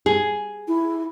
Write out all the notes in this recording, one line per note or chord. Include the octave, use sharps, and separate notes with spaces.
G#4
E4